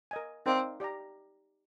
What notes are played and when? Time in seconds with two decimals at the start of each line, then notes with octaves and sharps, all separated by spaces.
0.11 A#4 D#5 G#5
0.46 C4 D#4 A#4 D5 F5
0.80 G4 D5 G5 A#5